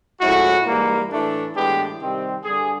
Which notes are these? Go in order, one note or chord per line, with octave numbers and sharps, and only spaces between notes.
A2 F3 G#3 C#4 E4 F#4
G#2 E3 G3 A#3
A2 E3 A3 D4
A2 E3 G#3 B3 D4 G4
C3 D#3 G3 C4
G2 D3 G3 G#4